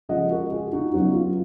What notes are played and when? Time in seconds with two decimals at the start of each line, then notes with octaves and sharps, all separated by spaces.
0.09 C#3 F3 G#3 D#5 F#5
0.30 F#4 A#4
0.52 F4 G#4
0.73 D#4 F#4
0.93 C#3 F#3 B3 D#4 F#4
1.14 F4